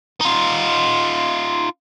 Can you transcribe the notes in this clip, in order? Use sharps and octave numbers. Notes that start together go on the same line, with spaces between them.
D#4 F4